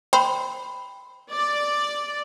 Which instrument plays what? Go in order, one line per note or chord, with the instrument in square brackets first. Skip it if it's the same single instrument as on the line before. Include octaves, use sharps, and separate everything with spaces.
[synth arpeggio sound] C5 [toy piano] G5 B5
[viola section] D5